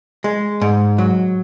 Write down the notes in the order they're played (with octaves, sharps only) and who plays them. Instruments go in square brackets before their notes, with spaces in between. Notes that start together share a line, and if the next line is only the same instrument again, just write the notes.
[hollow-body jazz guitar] G#3
G#2
F#3